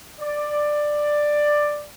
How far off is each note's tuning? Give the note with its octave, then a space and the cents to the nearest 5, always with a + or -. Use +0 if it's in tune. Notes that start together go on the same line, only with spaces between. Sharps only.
D5 +10